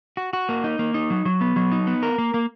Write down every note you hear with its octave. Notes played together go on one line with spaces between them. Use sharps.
F#4
F#4
A#3
D#4
A#3
D#4
F#3
F#3
B3
F#3
D#4
B3
A#4
A#3
A#3